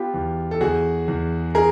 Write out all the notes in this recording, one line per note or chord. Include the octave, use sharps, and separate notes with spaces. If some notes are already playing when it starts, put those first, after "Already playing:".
Already playing: B3 F4 G4
E2
A4
E2 F#4 G#4
E2
G#4 A#4